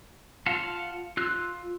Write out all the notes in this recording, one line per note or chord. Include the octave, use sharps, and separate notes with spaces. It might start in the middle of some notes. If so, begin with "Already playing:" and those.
F4 F5 F#5 A5
F4 E6 F#6